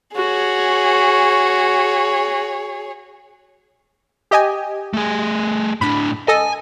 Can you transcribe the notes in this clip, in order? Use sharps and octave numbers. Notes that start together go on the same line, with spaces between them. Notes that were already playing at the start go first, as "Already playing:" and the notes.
F#4 G#4 C#5
G4 D#5 G#5
A3 G#4
A2 D4 B5
A4 D#5 G#5